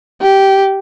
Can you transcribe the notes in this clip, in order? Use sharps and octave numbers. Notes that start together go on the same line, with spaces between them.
G4